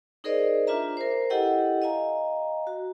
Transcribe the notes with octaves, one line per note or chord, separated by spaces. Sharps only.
D#4 G#4 A#4 C5 D5 D#5
D4 F4 B4 E5 A#5
A#4 C5
E4 G4 A4 D#5 F#5 G5
D#5 F5 G#5 A#5
F#4